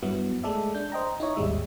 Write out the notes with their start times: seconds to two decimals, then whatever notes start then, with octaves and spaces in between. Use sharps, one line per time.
0.02 G2 F#3 B3 E4
0.43 G#3 A3 A4 D5 E5
0.75 D4 G6
0.92 C5 D#5 G5 A#5
1.20 D#4 E4 C#5 D#5
1.36 G#1 D#2 G3 G#3 E5